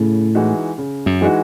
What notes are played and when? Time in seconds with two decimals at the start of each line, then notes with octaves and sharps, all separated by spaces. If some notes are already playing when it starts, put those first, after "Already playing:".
Already playing: A2 C#3
0.35 E3 G#3 D#4 F#4
0.78 C#3
1.06 F#2
1.21 E3 G#3 D#4 F#4